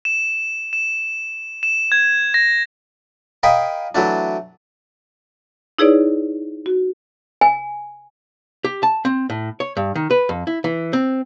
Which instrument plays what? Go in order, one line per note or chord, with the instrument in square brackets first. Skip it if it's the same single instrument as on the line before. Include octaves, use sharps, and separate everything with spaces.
[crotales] E7
E7
E7
G#6
A#6
[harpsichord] A#4 D#5 F5 G5 G#5 B5
E3 F#3 A3 D4
[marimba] D#4 E4 G#4 B4 C#5 D5
F#4
[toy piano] G#5
[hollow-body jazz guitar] G4
A5
C4
A2
C#5
G2
D#3
B4
F2
E4
E3
C4